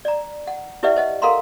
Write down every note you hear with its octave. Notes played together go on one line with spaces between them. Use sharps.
D5 A#5
F#5
E4 G4 B4 D5 E5 F#5
C5 D#5 F#5
A4 A#4 F5 F#5 A#5 C6